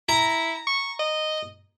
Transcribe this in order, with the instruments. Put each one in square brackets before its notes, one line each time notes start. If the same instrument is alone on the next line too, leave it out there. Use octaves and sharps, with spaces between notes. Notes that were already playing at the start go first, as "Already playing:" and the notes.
[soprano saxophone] E4 [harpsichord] A#5
[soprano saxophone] C#6
D#5